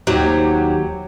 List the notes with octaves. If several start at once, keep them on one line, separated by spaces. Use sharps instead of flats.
D#2 F#3 D#4 G4